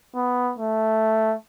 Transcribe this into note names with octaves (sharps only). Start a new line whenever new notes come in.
B3
A3